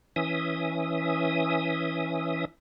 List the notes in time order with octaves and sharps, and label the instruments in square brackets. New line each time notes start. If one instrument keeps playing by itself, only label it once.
[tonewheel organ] E3 C#4 E5 D#6